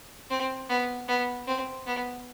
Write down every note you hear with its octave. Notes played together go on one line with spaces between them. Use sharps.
C4
B3
B3
C4
B3